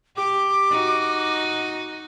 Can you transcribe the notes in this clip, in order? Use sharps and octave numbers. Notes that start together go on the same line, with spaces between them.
G4 D6
D#4 F#4